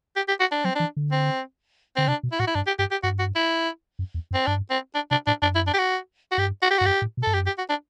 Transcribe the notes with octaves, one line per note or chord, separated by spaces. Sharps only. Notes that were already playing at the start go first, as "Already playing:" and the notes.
G4
G4
F#4
D4
F#3 C4
E3 D4
D3
C4
D3 C4
C3 D4
B2
E4
A2 F#4
E4
G2 D4
G4
G2 G4
G4
G2 F#4
F#4
E4
F#2
E2
F#2
C4
G2 D4
C4
D4
C3 D4
A2 D4
F#2 D4
E4
D4
G4
F#4
F#4
G2 G4
F#4
G4
F#4
G2
F#2 G4
A2
B2
G2 A4
F#2 G4
G4
F#4
D4